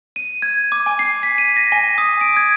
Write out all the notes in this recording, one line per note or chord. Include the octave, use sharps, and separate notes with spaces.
D#7
G#6
D6
G#5
C7
B6
D#7
A#6
G#5
D#6
D7
G#6